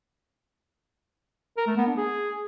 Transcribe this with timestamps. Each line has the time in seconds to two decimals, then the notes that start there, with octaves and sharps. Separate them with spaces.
1.57 A#4
1.67 A3
1.77 B3
1.87 D4
1.97 G#4